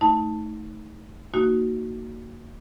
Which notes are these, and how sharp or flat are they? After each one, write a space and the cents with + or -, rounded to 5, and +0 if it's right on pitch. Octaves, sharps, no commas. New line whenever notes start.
A3 +0 D#4 +15 A5 +10
A#3 -15 D#4 +0 F#4 +0